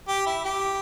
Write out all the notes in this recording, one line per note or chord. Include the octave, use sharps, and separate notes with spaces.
G4
E4
G4